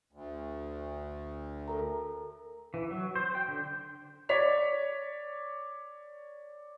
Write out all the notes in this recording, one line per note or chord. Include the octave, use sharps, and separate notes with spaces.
D2
A4 A#4 A#5
E3
F#3
C5
G5
D3
C#5 D5 B6 F7